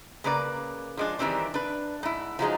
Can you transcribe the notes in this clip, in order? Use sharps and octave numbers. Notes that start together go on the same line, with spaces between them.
C#3 A#3 B4 D5
F3 G#3 D4
D#3 E3 G3 C4 D4
D4 B4
G#2 E4
F3 F#3 G#3 D#4